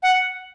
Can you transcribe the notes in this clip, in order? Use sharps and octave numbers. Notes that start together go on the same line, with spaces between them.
F#5